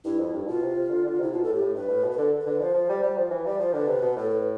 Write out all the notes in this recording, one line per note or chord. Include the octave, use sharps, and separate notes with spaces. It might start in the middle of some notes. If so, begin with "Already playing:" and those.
G2 E4
F2
G2
B2 F4
C3
C3
D3
D3
C3 E4
B2 F4
A2 A4
G4
A2
G2 B4
A2
B2
B4
D3 A4
B4
D3
F3 C5
F3
G3
G3
F3
E3
G3 D5
F3 C5
D3 B4
C3
B2
A2 A4
B4